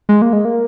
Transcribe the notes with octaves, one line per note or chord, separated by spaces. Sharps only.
G#3
A#3
G#3
A#3